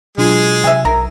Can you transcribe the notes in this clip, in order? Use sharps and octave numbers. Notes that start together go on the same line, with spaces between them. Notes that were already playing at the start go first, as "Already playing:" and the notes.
B2 F#3 G#3 D4 F4 G#4
C3 E5 G#5
B1 A#4